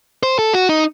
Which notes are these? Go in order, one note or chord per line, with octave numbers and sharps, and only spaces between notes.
C5
A4
F#4
D#4